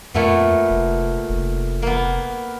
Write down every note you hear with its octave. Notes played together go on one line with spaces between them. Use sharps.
F2 A#2 A3 B3
F1
F1
A#3 B3